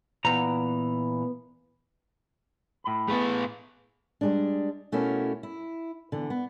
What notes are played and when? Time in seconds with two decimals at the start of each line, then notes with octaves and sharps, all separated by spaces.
0.25 A#2 E3 B3 A#5
2.84 A2 B5
3.08 A3 B3 G#4 B4
4.21 G3 G#3 D4
4.92 B2 A3 A#3 C#4 E4 F#4
5.43 E4
6.12 D3 E3 B3
6.30 B3